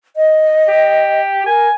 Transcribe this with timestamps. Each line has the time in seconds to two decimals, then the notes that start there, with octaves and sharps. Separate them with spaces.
0.16 D#5
0.69 G4
1.46 A#4 G#5